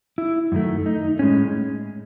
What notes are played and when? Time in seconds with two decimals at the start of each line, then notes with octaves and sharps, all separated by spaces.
0.18 E4
0.52 F#2 D#3 A3
0.86 D#4
1.19 A2 G#3 C#4